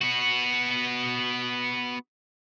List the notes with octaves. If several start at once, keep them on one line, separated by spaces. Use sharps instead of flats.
B3 F#4